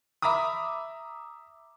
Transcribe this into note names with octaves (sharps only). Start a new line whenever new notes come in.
E5 A#5 B5 D6 D#6